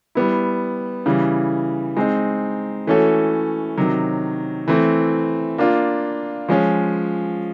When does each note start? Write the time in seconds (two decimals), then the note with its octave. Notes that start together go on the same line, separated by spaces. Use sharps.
0.15 G3 B3 E4
1.06 C#3 E3 G3
1.97 G#3 C4 D#4
2.87 E3 A3 C#4 F#4 A4
3.77 C3 D#3 F#3
4.68 E3 A3 C4
5.58 A#3 D4 F4
6.49 F3 G#3 C#4